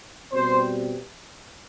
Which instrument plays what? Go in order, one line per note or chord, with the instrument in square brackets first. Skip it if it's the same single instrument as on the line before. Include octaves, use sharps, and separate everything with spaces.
[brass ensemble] B2 G3 C4 C5